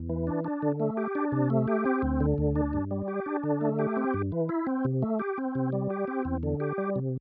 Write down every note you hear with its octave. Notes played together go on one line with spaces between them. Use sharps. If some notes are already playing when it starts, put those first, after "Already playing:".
Already playing: E2
E3
D4
D4
D3
A3
G4
D4
C3
A3
G4
C4
D2
D3
D2
D4
G2
G3
G4
D4
D3
A3
G4
C4
G2
E3
E4
C4
C3
A3
G4
C4
C3
G3
G4
C4
E2
D3
G4
G3
C3